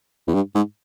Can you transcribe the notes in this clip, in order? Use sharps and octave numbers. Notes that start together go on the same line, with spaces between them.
E2
G2
G#2